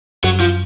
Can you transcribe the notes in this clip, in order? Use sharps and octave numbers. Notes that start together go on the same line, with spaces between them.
F#2 F#3
F3